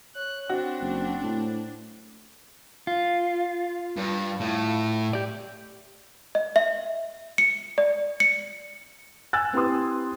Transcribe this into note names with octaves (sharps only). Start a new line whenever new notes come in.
C#5 F#6
C4 D4 F#4
F#1
A2
F4
G2
A2
G4 D5
D#5
E5
C#7
D5
C#7
G#5 E6 F#6 G#6 A6
C4 E4 G4 B4 C6 D#6